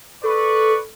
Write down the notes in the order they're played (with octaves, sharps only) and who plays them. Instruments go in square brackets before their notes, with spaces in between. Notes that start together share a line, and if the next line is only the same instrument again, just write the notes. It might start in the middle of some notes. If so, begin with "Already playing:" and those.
[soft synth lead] A4 [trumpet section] B4 D5 C#6